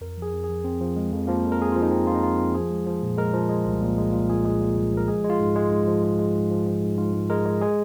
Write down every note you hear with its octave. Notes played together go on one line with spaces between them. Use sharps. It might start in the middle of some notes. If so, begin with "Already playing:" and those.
F2 A#4
F3 G#4
F2
G#4
F3
F2 C4
F3
G#3
F2
F3 A#3
F2
A#4
F2 G#4
F3 F4
D#4
F2 C4
F3 F4
D#4
F2 F4
F2 F4
F3 G#4
G#3
F3
A#2
G#3 A#4
F3
G#3
C2
A#2
G#3
A#2 F4
A#2 G#4
G#3 G#4
A#2
C2
F3 A#4
G#3 G#4
G#3
F4
G#2
G#3
G#2
F3
G#3
G#3
G#2
F3
F3
G#2
G#2 F4
G#2
G#3 A#4
G#3
G#3 G#4